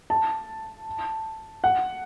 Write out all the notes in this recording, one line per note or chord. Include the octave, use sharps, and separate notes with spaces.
A5
F#5